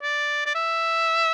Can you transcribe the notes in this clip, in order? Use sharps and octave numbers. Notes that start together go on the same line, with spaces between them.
D5
D5
E5